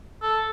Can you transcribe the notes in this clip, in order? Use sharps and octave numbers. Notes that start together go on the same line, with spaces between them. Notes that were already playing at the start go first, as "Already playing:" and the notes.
A4